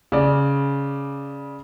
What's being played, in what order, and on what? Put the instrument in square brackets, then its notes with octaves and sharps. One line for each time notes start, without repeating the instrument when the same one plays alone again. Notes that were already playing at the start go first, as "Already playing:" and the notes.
[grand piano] C#3 D5